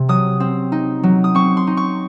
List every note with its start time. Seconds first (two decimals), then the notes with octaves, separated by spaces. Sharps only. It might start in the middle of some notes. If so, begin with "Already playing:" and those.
Already playing: C3
0.09 F#3 D#6
0.40 C4
0.72 D#4
1.03 F#3
1.24 D#6
1.35 C4 C#6
1.57 C6
1.67 D#4
1.77 C#6